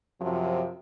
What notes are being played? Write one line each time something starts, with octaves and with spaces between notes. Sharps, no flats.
F#2 C3 F3